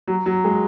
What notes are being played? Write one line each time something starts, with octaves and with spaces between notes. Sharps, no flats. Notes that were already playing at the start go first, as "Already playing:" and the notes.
F#3
F#3
G#3